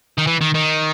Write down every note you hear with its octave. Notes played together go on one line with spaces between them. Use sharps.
D#3
E3
D#3
D#3